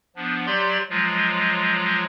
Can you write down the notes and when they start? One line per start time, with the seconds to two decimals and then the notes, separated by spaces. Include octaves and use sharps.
0.16 F3 B3 D4
0.46 F#3 G4 D5 C6 G6
0.89 F3 F#3 G#3 F4